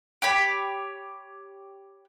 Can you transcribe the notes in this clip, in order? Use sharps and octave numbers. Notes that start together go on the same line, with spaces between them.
G4 C#5 B5